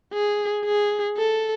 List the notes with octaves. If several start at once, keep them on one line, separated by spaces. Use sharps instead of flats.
G#4
G#4
A4